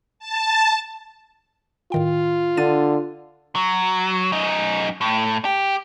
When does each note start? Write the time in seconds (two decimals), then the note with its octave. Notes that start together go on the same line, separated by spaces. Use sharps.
0.19 A5
1.92 A2 D#3 F4 G5
2.57 D3 D4 A6 D#7
3.56 F#3
4.32 F#2 D#4
5.01 A2
5.45 G4